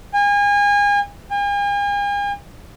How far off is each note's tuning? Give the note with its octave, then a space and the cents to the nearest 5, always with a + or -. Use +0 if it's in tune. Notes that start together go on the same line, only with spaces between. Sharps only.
G#5 -35
G#5 -45